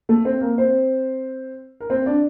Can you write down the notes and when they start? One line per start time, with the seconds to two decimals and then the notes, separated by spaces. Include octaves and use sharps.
0.09 A3 A4
0.25 C4 C5
0.41 A#3 A#4
0.58 C4 C5
1.80 A#4
1.90 C4 C5
2.06 D4 D5